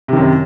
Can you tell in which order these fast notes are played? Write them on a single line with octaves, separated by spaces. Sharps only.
C3 D#3 F#2